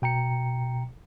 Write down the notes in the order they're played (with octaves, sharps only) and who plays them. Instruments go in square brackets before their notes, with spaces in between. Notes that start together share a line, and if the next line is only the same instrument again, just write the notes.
[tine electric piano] B2 G5 A#5 C#7